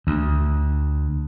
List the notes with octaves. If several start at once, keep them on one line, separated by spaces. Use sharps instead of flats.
D2